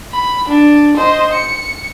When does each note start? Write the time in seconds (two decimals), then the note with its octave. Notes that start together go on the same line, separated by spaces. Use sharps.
0.13 B5
0.49 D4
0.97 C5 D#5
1.33 C#7